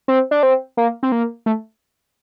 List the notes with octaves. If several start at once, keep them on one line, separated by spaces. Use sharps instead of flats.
C4
D4
C4
A#3
C4
A#3
A3